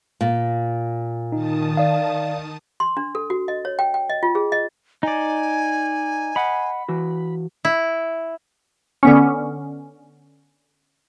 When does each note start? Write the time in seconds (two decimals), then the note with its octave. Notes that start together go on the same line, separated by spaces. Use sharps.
0.21 A#2
1.32 D#3 D#4 A5 D#6
1.77 D5 F5
2.80 C6
2.97 D4
3.15 A4
3.30 F#4
3.48 D#5
3.65 C#5
3.79 G5
3.94 G5
4.10 D#5
4.23 F4
4.35 G#4
4.52 D#5
5.03 D#4 D5 G#5
6.36 D#5 F#5 B5
6.89 E3 F#4
7.65 E4
9.03 D3 B3 C#4